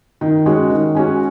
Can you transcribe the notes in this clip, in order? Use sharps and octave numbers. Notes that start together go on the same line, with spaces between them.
D#3
G#3 C#4 F#4
D#3
G#3 C#4 F#4